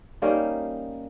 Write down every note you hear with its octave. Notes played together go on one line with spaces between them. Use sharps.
G3 A#3 C#4 D#4